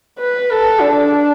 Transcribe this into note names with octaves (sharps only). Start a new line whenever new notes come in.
B4
A4
D4